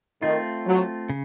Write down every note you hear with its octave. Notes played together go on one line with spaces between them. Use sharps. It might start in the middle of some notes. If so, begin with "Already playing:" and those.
D#3 A3 C4 F4
F#3
C#3